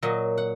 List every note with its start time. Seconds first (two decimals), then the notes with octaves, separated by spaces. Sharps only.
0.03 A#2 F#3 D#5
0.38 F#5